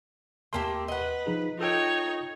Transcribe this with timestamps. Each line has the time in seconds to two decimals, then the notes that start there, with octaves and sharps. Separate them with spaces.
0.53 D#2 A3 A#3 G4 A#4 C6
0.88 B4 D#5 F#5
1.26 F3 D#4 G#4
1.59 D#4 F4 A4 C#5 G5